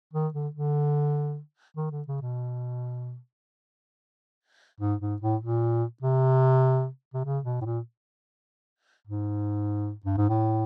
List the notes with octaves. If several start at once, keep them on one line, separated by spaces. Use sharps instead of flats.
D#3
D3
D3
D#3
D3
C#3
B2
G#2
G#2
A2
A#2
C3
C3
C#3
B2
A2
A#2
G#2
G2
G#2
A2